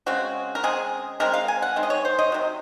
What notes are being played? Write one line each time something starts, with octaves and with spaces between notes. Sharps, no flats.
C#3 G#3 C4 F#4
A#4
C#3 G#3 C4 G#4
D#3 G#3 C4 A#4
F5
G#5
F#5
D#3 G#3 C4
D#5
C#5
C5
D#5
C3 D#3 F#3